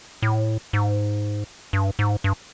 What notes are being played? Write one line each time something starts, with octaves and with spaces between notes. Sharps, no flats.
A2
G#2
G2
G#2
G2